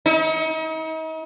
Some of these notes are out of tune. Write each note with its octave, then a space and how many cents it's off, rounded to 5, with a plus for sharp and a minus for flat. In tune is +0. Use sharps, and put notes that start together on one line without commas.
D#4 +40